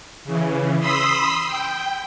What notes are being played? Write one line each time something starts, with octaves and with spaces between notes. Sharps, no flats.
C#3 E3
B5 C6 D#6 E6 B6 C7
G5